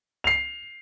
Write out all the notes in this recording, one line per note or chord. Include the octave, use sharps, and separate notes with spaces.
C7 F7